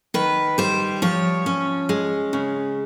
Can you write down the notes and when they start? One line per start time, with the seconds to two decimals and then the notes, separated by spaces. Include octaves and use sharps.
0.14 D#3 B4
0.58 G3 C5
1.02 F3 C#5
1.46 C#4
1.89 G#3
2.33 C#3